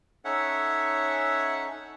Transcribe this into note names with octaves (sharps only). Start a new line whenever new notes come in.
C#4 D#4 A4 C#5 E5 F#5